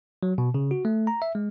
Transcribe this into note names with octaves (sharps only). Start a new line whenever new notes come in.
F#3
B2
C#3
F#4
A3
A#5
E5
G#3